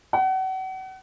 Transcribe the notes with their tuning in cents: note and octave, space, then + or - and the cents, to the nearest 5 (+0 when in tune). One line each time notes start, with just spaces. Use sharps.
F#5 +35